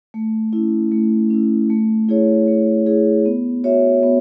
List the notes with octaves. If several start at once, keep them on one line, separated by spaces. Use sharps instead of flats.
A3
C#4 E4
A3
C#4 E4
A3
E4 G#4 C#5
A3
E4 G#4 C#5
B3
F#4 C#5 E5
B3